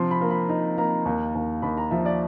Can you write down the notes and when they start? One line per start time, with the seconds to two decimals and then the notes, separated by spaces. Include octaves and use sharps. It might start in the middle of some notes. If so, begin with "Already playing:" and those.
Already playing: C3 F3 C6
0.11 B5
0.21 A#3
0.31 B5
0.49 D#4 A#5
0.78 A#3 A#5
1.05 D#2
1.35 D#2
1.62 D#2 B5
1.77 A#5
1.91 F3 E5
2.05 D5